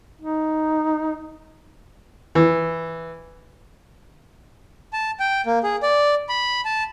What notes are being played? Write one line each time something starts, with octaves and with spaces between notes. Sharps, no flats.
D#4
E3
A5
G5
A#3
G#4
D5
B5
A5